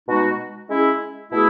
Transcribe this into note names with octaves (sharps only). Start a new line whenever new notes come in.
B2 G#3 D#4 F#4
G#3 C#4 E4 G#4
B2 A3 E4 G#4